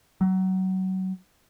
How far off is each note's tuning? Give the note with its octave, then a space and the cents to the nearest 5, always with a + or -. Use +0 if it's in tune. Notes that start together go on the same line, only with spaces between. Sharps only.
F#3 +25